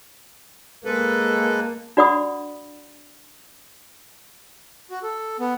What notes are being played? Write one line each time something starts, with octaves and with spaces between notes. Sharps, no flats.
G#3 A#3 A4 B4
D4 F#4 D5 F#5 B5 D#6
F#4
A4
B3